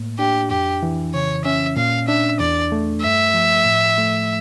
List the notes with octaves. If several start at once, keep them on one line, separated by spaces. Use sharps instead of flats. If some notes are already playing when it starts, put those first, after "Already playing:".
Already playing: A2 A#3
D4 G4
F2 G4
E3
C#3 C#5
C#4 E5
A#2 F5
D4 E5
E2 D5
A3
G2 E5
F3
A2
A3